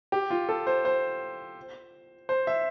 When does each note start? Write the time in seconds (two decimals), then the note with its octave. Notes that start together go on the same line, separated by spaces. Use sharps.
0.12 G4
0.30 F4
0.49 A4
0.67 C5
0.85 C5
2.29 C5
2.47 E5